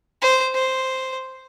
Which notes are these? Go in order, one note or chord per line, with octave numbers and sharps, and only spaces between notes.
C5
C5